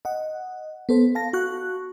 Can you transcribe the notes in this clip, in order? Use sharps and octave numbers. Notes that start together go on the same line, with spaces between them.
D#5 F#5
B3 A4 C5
F5 A5 A#6
F#4 C#6 F#6